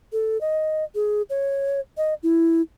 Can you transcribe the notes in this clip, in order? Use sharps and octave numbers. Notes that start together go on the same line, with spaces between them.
A4
D#5
G#4
C#5
D#5
E4